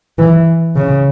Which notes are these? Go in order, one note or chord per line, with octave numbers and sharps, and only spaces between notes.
E3
C#3